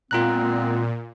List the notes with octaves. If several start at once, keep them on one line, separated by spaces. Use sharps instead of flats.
A#2 G#3 B3 C4 F4 A#5 F#6